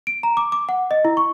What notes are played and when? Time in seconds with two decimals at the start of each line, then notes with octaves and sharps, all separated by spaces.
0.07 D7
0.23 A#5
0.37 D6
0.52 D6
0.69 F#5
0.91 D#5
1.05 E4
1.17 C#6